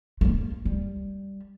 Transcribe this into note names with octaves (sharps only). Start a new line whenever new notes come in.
A3 A#3
G3